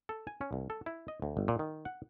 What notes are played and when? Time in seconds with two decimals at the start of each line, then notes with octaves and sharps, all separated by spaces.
0.09 A4
0.27 G#5
0.41 C#4
0.53 C2
0.70 A4
0.86 E4
1.08 D#5
1.22 D2
1.37 G1
1.48 A#2
1.59 D#3
1.85 F#5